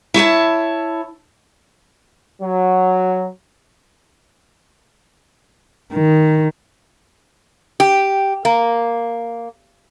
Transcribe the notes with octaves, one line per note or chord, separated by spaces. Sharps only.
E4 C#5 G#5 A5
F#3
D#3
G4
A#3